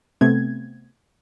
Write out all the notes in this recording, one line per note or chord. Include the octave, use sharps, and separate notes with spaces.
C3 A3 B3 C4 G#6